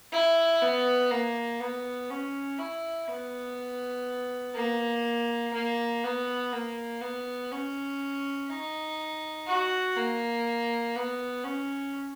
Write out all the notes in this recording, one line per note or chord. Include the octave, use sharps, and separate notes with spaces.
E4
B3
A#3
B3
C#4
E4
B3
A#3
A#3
B3
A#3
B3
C#4
D#4
F#4
A#3
B3
C#4